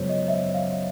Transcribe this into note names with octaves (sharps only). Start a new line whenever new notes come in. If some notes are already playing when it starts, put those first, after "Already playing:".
Already playing: F#2 C#3 F3 G#3 B3 C5 C#5
D#5
E5
F5